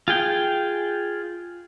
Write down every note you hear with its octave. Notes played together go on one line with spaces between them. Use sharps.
F4 G#4 G5